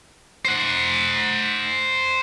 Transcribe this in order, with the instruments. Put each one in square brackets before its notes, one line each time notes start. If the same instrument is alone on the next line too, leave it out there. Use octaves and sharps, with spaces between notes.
[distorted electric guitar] C5 F#5